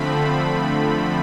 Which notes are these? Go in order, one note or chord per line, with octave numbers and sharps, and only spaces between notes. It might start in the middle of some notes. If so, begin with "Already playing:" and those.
Already playing: D3 F3 A3 C4 B5